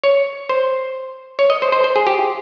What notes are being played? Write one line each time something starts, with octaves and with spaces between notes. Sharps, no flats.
C#5
C5
C#5
D#5
C5
C5
C5
G#4
G4